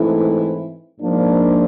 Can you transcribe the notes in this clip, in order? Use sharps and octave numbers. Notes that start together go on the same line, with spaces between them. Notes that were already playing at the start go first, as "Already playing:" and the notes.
Already playing: G#2 E3 A3 C4 E4
G#2 F3 A#3 D4